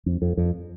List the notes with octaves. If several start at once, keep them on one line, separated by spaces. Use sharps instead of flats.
F2
F2
F2